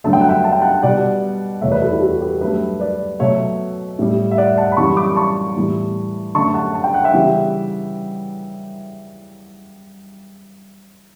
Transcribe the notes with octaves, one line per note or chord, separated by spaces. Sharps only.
G2 D3 F#3 A3 A5
G5
F#5
E5 G5
A5
G5
F#5 A5
B2 G3 D5 F#5
E2 B2 A3 C#5 E5
B4 D5
F#4 A4
E4 G4
F#4 A4
G4 B4
G2 F#3 A3 G4 B4
B4 D5
B2 F#3 A3 C#5 E5
A2 G3
E5
D5 F#5
F#5 A5
B5
F#2 E3 G3 A5 C#6
B5 D6
A5 C#6
A2 E3 G3
F#2 D3 A3 A5 C#6
F#5 A5
A5
G5
F#5
E5 G5
C#3 E3 G3